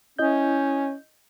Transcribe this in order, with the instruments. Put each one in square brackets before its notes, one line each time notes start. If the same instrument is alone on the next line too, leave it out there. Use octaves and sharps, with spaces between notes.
[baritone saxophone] C#4 [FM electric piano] E4 D#5 G6